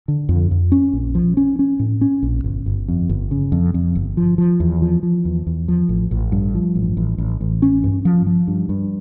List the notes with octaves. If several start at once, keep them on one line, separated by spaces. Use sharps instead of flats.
D3
F2
F2
C#4
A#1
F3
C#4
C#4
A2
C#4
A#1
G1
G1
F2
G1
C#3
F2
F2
G1
F3
F3
E2
F3
F3
E2
E2
F3
A1
A1
G2
F3
A1
A1
A1
A1
C#4
G2
F3
F3
G2
G2